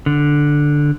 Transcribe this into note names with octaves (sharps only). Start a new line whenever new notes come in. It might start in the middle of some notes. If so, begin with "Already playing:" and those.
D3